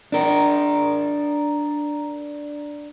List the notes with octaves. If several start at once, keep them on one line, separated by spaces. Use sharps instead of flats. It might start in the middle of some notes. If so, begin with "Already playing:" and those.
D4 A#4